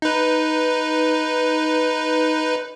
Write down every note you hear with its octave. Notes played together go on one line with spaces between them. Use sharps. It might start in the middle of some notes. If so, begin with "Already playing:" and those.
D#4 B4